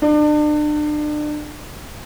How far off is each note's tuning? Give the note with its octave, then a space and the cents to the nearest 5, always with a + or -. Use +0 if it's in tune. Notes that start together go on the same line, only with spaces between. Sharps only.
D4 +35